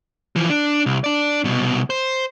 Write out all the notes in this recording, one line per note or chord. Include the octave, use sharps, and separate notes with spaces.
E3 F3
D4
C2
D4 D5
C2 B2
C5